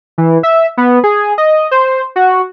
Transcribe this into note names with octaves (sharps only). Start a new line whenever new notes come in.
E3
E5
B3
G#4
D#5
C5
F#4